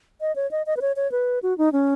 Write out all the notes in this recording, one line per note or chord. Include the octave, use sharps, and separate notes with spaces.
D#5
C#5
D#5
D#5
B4
C#5
C#5
B4
F#4
D#4
C#4